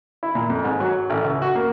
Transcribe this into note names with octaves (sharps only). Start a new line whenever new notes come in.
E4
A#2
F2
G#2
F#3
A1
C#2
F#4
A#3